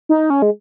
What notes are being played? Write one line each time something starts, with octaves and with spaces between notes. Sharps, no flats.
D#4
C#4
G#3